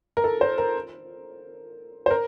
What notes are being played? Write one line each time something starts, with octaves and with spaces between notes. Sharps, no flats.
A#4
A4
C5
A#4
C5
A#4